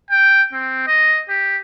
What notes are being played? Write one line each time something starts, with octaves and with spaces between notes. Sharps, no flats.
G5
C4
D#5
G4